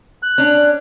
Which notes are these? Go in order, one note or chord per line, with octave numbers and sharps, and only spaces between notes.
F#6
C#4 D4